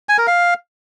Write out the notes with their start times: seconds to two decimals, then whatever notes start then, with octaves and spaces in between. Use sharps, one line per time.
0.09 G#5
0.18 A#4
0.27 F5